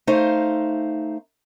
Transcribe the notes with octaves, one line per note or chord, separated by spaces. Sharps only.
A3 D#4 C5 F5